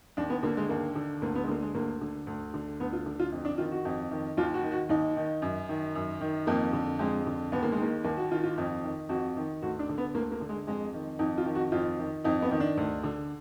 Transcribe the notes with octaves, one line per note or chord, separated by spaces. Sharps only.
D#2 D4
B3
D3 A#3
G#3
D#2 A#3
D3
D2 A#3
B3
G#3
D3 A#3
G#3
D2 A#3
D3
D2
D3
D2 B3
F4
D3
F4
F2
D4
D#3 F4
F#4
F2
D#3
D#2 F4
F#4
D#3
F#4
D#2 D#4
D#3
F#2
D#3
F#2
D#3
F2 A#3
D3
F2 G#3
D3
D#2 B3
A#3
G#3
D#3 A#3
D#2 A#3
F#4
D#3 F4
F4
F2
D#3
F2 F#4
D#3
D2 F#4
D4
D3
B3
D2 A#3
A#3
D3
G#3
F2 G#3
D#3
F2 D#4
F4
D#3
F#4
F2 F4
D#3
F2 D#4
B3
D#3
D4
D2
D3